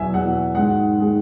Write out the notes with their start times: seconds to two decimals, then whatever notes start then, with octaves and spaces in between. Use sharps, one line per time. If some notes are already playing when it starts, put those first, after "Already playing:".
Already playing: E2 B2 F#3 E5 G#5
0.14 E2 B2 F#3 F#5
0.55 G#2 D#3 G#3 F#5
0.99 D#3 G#3